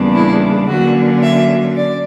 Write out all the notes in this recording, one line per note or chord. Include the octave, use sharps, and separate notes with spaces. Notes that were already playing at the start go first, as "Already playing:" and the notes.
Already playing: E2 C#3 G3 A#3 D4
E4
D3 F#3 A#3 C#4 F#4
E5
D5